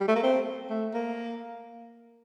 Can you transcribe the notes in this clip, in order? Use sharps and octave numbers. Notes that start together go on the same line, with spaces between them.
G3
A3
A#3
C4
A3
A#3